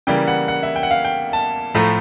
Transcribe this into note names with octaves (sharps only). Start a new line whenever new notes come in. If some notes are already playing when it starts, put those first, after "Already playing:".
C#3 E3 G3 A#3 G5
F#5
F#5
E5
G5
F#5
F5
G5
A5
A2 F3 A3 A#5